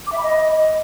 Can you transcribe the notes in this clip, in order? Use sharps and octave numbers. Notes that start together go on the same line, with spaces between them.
D6
E5
B5
D#5